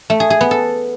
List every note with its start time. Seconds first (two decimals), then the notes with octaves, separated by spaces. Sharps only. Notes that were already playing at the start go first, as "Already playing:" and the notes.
0.10 A3
0.20 G#4
0.30 G#4
0.41 B3
0.51 A4